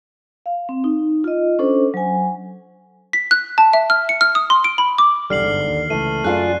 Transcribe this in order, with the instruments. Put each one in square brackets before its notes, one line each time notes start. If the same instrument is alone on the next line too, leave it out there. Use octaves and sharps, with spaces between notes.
[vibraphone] F5
C4
D#4
F4 D#5
C#4 D4 A4 C5
F#3 G#5
[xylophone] B6
F#6
A5
E5
F6
C#7
F6
D#6
C6
D7
B5
D6
[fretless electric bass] B1 E2 G3 [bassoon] D3 [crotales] F6 C7 F#7
[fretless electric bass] G1 G#2
D#2
[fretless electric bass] C#2 E3 [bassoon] A3 [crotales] D#7
[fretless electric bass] F#2 [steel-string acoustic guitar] D4 F4 G#4 [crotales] F#6